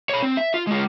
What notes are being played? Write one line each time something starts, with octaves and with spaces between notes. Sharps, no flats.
C#5 B5
C4
E5
F4
G#3 F4